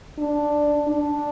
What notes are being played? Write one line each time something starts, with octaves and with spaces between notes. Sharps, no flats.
D4
D4